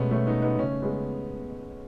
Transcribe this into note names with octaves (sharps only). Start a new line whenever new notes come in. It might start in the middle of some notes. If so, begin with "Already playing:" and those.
Already playing: B2 G#3 A3 B3 C#4
A3 C#4
B3 D#4
B3 D#4
C#3 A3 C#4
G#3 B3